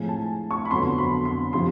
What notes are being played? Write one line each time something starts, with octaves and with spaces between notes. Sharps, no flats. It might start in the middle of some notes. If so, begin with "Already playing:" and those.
Already playing: A2 F3 G#3 C4 G#5
A5
C#6
B5
F2 D3 F#3 B3 C6
B5
C6
C3 F3 C6